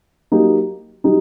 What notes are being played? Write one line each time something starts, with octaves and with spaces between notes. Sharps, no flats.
F#3 A#3 D#4 G4
F#3 D#4 G4